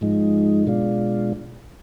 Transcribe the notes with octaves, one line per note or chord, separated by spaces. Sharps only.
G#2 F3 G#3 D#4
B2 G#3 D4 F4